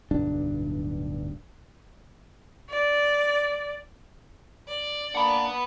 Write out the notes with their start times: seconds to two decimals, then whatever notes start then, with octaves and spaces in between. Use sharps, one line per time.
0.11 D1 B1 G2 D4
2.70 D5
4.68 D5
5.15 A#3 D4 F#5 B5